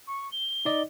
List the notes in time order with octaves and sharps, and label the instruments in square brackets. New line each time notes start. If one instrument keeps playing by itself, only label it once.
[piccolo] C#6
G7
[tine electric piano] D#4 D5 D#5